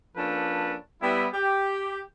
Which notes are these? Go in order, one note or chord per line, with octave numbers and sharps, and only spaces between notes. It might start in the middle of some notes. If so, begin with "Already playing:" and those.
F3 A#3 C#4 D4 A4 B4
G3 B3 E4
G4